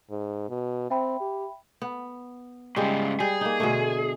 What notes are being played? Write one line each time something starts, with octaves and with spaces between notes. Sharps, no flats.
G#2
B2
C4 E5 G5 B5
G4
B3
G#2 C#3 G3 G#3
G3 G#4
A#3 D#4
B2 D3 A3